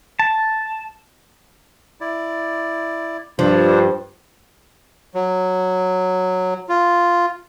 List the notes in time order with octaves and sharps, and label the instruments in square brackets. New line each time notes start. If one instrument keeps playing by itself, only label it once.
[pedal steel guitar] A5
[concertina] E4 D5
[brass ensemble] G2 [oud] F3 [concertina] D4 C5
[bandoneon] F#3
F4